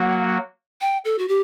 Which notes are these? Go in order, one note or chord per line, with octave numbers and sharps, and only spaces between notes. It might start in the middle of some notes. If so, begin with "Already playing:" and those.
Already playing: F#3 A#3 F#4 F#5
G5
A4
F#4
G4